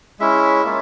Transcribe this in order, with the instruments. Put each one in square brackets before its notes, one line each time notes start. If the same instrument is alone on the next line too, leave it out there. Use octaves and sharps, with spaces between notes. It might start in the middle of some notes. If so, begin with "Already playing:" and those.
[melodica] G#3 C#4 E4 E5
A#3 C#4 F4